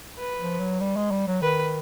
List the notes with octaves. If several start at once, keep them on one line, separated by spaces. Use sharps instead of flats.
B4
F3
F#3
G3
G#3
G3
F#3
D#3 B4